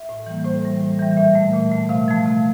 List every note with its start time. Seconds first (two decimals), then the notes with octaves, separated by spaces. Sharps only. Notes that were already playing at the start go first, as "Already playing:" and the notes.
Already playing: E5
0.09 A2
0.27 E3 G3 A#3
0.45 A2 C5
0.63 E3 G3
0.81 A2
0.99 E3 G3
1.17 A#2 E5
1.35 A3
1.54 A#2
1.71 A3
1.89 C3 F5
2.08 F3 A3
2.26 C3